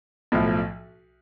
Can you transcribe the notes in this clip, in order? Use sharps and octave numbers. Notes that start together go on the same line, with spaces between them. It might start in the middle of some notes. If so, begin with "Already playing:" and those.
B1 A2 F3